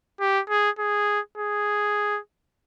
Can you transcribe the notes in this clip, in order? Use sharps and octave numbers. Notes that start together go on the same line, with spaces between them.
G4
G#4
G#4
G#4